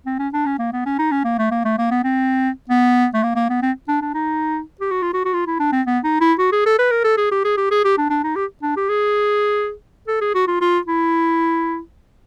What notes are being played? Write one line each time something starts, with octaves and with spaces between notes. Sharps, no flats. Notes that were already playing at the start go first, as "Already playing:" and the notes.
C4
C#4
D4
C#4
A#3
B3
C#4
D#4
C#4
A#3
A3
A#3
A3
A#3
B3
C4
B3
A3
A#3
A#3
B3
C4
D4
D4
D#4
G4
F#4
F4
F#4
F#4
F4
E4
D4
C4
B3
D#4
E4
F#4
G#4
A4
B4
A#4
A4
G#4
G4
G#4
G4
G#4
G4
D4
D4
D#4
G4
D4
G4
G#4
A4
G#4
F#4
F4
F4
E4